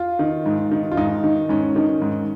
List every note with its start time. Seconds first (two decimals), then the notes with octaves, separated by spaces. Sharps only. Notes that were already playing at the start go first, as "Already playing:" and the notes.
Already playing: F4
0.19 D#3
0.46 G#2
0.72 D#3
0.92 F4
0.97 G#2 D#4
1.24 D#3
1.49 G#2 C#4
1.76 D#3
2.02 G#2